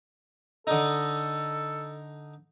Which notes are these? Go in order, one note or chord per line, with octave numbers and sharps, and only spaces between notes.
D3 D#4 A4